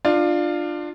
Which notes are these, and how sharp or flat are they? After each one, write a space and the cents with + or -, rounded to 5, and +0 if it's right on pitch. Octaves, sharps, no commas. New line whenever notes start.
D4 +20 F4 +0